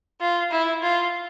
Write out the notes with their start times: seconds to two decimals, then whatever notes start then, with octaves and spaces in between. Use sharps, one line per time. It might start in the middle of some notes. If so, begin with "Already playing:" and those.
0.21 F4
0.52 E4
0.82 F4